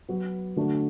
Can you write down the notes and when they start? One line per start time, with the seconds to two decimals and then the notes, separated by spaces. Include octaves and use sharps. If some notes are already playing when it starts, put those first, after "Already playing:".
0.08 F#3 B3 F#4
0.56 D3 A3 D4 F#4